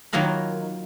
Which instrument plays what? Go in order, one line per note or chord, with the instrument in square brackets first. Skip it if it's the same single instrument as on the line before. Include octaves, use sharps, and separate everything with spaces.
[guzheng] D#3 F#3 A#3 F4 A#4 B5